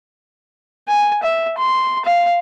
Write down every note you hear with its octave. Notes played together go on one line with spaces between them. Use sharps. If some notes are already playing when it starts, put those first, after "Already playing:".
G#5
E5
C6
F5